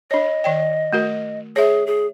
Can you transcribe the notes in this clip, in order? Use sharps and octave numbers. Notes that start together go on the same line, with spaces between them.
D4 C#5 D#5
D#3 D5 G5
A3 F#4 A#4
G#4 C#5 E5
G#4